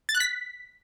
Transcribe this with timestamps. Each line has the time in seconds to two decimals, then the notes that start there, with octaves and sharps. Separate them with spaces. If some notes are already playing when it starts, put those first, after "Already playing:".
0.09 A6
0.15 F#6
0.20 B6